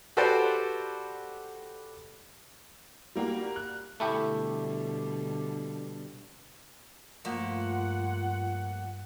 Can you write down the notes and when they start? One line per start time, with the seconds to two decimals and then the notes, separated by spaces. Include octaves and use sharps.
0.17 F#4 G4 A4 B4 C5 D5
3.15 G3 A#3 F#4 G4
3.56 F#6
4.00 B2 D3 G3 A3 E4 G4
7.25 G2 F3 A3 A#3 F4 F#5